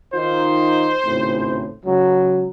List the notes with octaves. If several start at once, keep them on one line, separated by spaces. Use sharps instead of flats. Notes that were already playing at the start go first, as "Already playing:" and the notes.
D#3 D#4 F4 C5
G#1 C#2 A2
C#2 F#3